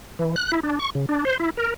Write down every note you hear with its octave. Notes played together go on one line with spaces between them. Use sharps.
E3
F#6
E4
D4
C#6
C#3
D4
C5
E4
A#4